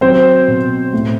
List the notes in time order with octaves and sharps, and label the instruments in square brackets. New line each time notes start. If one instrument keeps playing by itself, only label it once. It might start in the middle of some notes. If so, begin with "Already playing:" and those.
[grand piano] F#3 C4 C5
B2
A2